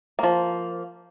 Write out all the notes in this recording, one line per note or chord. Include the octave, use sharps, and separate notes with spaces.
F3 A#3